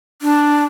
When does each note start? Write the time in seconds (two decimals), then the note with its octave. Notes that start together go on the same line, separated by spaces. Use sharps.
0.22 D4